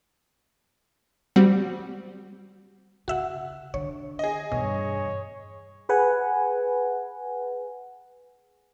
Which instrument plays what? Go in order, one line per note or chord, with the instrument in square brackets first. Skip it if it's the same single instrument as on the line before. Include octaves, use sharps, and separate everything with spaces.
[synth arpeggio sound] G3 C4 F#4
[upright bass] C#3 [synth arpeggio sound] F#4 E5 F#5
[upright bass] D3 [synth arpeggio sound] C#5
[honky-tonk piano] G#4 D#5
[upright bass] E2 G2 [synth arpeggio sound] B2 [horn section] C#5
[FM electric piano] G#4 B4 F#5 G#5